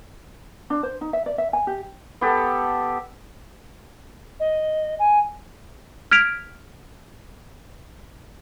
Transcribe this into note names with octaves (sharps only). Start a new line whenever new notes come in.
D4
C5
D#4
E5
D5
E5
G#5
G4
B3 G4 A4
D#5
G#5
F6 G#6 B6 D7 F7